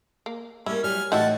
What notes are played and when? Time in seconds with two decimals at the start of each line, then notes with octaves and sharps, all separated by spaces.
0.26 A#3
0.66 G3 A#3 C#4 E4
0.84 F#3 G3 G#5 F6
1.12 A2 E3 D#4 F#4 E5 F#5 G5 A5